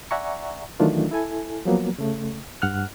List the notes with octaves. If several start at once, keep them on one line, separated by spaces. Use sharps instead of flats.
D5 E5 F#5 G#5 A#5 C#6
D#3 E3 F#3 A3 D4 F4
E4 A4 G#5
F3 F#3 A#3 B3
C#3 A3
G2 F#5 F6 F#6